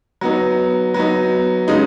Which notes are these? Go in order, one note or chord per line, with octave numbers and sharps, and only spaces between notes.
F#3 B3 D#4
F#3 B3 D#4
C#3 G#3 D#4